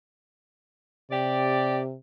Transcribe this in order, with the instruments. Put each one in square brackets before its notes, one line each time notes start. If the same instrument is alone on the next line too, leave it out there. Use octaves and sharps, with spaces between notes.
[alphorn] C3 [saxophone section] G4 D5